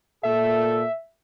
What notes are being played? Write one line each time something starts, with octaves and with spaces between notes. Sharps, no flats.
A#2 A4 E5